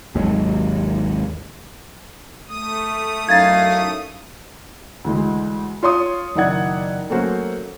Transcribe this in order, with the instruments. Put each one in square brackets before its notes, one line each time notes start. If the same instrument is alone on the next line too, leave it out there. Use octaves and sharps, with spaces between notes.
[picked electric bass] G#1 D#2 F#3 G#3
[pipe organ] A3 D#6
[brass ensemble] F#2 D#4 E4 [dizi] F5 [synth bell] G#6 A6
[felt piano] D2 E3 G#3
F4 C#5 C6 D#6
F#1 D#3 E4 D5 F#5 G#6
F#3 A3 A#3 C#4 F#4 C5